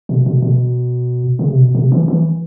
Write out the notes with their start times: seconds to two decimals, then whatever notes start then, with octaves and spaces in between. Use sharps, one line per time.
0.09 B2
0.26 B2
0.42 B2
1.39 C#3
1.49 C3
1.58 B2
1.75 C3
1.92 E3
2.08 E3